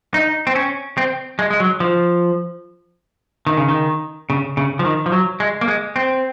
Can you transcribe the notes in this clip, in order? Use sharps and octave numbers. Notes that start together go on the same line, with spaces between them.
D#4
C4
C#4
C4
G#3
G#3
F#3
F3
D#3
C#3
D#3
C#3
C#3
F3
D#3
F3
F#3
G#3
A#3
G#3
C4